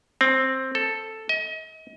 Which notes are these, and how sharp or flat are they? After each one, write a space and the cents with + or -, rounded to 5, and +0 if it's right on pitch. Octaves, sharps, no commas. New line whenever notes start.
C4 +10
A4 +5
D#5 +35